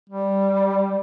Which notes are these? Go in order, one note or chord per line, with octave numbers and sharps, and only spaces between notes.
G3